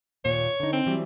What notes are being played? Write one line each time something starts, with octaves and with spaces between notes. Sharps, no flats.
D#2 A#2 C#5
D3 D#4
C4
E3 F#3 G3